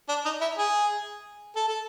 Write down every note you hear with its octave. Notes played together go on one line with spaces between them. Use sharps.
D4
D#4
E4
G#4
A4
A4